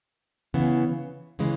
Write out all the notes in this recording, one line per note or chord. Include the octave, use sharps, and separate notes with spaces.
C#3 E3 B3
C#3 E3 G#3